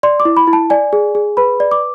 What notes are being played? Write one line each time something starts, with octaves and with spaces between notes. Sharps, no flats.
D5 C6
D6
E4
B5
E4
A5
D5 G#5
G#4
G#4
B4 B5
D5
D6